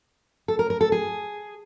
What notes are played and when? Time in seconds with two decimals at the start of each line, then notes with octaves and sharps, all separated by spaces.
0.48 A4
0.59 A#4
0.70 A#4
0.81 A4
0.92 G#4